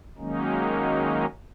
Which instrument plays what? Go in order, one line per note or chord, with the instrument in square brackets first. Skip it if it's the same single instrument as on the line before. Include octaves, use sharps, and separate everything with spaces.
[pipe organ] D#3 F#3 G#3 A#3 C#4 D#4